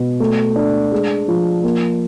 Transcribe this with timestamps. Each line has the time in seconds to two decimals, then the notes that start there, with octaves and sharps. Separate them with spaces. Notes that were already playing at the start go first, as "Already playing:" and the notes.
Already playing: B2
0.20 A3
0.56 D4
0.92 G#3
1.28 F3
1.63 A#3